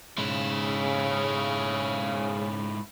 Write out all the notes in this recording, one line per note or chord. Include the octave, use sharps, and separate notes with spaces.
G#2 C#3 E4